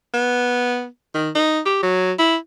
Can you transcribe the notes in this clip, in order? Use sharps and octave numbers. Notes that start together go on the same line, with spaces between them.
B3
D#3
D#4
G4
F#3
E4